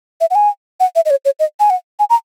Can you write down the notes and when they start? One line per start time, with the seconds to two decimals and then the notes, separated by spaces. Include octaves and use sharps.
0.21 E5
0.30 F#5
0.35 G#5
0.80 F#5
0.95 E5
1.05 D#5
1.10 C#5
1.25 C#5
1.39 D#5
1.60 G#5
1.70 F#5
1.99 G#5
2.10 A#5